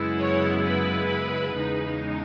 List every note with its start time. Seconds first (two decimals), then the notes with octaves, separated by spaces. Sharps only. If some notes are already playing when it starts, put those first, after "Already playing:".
Already playing: F#2 C#3 G#3 B3 E4
0.20 C#5
0.64 B4
1.53 E2 C#3 G#3 D#4